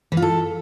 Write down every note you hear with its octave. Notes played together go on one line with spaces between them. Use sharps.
E3
F4
A4